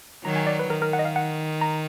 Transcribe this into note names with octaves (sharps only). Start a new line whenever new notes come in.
D#3 F#3 A#5
G#5
D5
B4
D#3 A#4
A#4
F#5
D#5
F5
F#5
A#5